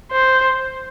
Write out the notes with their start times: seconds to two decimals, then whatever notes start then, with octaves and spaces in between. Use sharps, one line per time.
0.12 C5